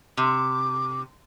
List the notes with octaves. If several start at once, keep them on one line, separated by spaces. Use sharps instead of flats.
C3 D6